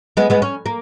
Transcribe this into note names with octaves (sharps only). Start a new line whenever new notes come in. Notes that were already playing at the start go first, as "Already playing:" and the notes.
G#3 B3
G#3 B3
C#4
A#3